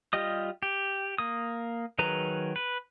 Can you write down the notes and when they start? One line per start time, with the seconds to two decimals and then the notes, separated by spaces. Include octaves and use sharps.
0.13 G3 F4 G4 D#5 D#6
0.63 G4
1.18 A#3 D#6
1.99 D#3 F#3 G#4 B4 A#5
2.56 B4